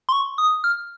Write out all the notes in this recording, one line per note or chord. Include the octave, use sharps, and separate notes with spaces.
C6
C#6
D#6
F6